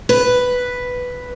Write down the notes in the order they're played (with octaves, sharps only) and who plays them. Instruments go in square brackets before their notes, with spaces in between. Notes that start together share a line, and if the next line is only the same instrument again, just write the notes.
[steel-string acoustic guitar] B4